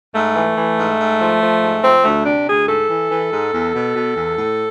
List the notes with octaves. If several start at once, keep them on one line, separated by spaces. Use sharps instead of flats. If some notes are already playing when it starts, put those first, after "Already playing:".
G#2 A3
E3
E3
G#2
G#2
F3
F3
G#2
F3 C4
D2 A3
C3 D4
D2 G#4
G#2 A4
E3
E3
G#2
E2
B2
B2
E2
A2